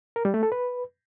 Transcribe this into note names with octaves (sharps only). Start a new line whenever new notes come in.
A#4
G3
A3
A4
B4